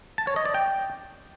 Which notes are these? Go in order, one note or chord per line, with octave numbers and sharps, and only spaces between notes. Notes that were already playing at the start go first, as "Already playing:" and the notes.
A5
C#5
D#5
D5
G5